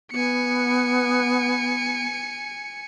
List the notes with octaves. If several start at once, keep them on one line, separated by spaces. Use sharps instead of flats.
B3 G#5 C#7